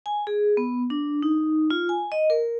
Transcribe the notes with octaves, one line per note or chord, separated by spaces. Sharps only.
G#5
G#4
B3
D4
D#4
F4
G#5
D#5
A#4